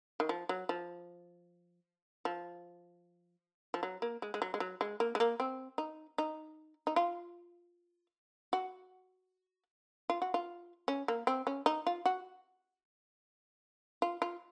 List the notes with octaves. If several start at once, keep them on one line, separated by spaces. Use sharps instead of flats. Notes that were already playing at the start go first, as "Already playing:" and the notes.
D#3
F3
F#3
F3
F3
F3
F#3
A#3
G#3
G#3
F#3
G#3
F#3
G#3
A#3
G#3
A#3
C4
D#4
D#4
D#4
F4
F#4
F4
F#4
F4
C#4
A#3
C4
C#4
D#4
F4
F#4
F4
F4